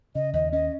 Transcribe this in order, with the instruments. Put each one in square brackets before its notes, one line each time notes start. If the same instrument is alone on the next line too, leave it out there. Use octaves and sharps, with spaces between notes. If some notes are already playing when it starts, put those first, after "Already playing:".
[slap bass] C#3 [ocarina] D#5
[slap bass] D#2 [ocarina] D#5
[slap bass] C#4 [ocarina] D#5